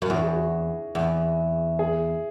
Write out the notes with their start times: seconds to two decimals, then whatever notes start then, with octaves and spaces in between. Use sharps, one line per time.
0.02 F#2
0.10 E2 F#4
0.23 G#4
0.36 F#4
0.95 E2
1.79 G#4